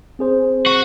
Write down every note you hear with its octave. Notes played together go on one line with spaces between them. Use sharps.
C4 G#4 C5
F#4